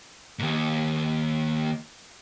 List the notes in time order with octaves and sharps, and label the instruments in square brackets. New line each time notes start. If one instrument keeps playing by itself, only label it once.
[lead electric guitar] D#2 G#2